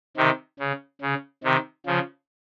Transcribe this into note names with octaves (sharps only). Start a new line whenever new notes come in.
C3 D#3
C#3
C#3
C3 D#3
C#3 F3